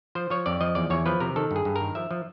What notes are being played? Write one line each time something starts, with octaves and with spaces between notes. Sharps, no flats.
F3 C5
F3 C#5
F2 D5
F3 D#5
E2 D5
E2 C#5
F3 B4
C3 A#4
D#3 A4
G2
G#4
G2
D#3 A#4
F3 E5
F3